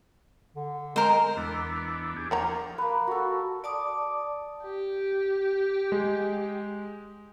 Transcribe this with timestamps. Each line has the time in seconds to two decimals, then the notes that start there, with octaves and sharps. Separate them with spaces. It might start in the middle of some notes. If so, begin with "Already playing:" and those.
0.56 D3
0.96 G#3 A#4 C5
1.37 E2 B3 D4
2.16 D4 G4 G#4
2.31 F3 A#3 F#5 A#5
2.78 A#3 B4
3.07 F#4 A4
3.64 D5 A5 D6 D#6
4.63 G4
5.92 G#3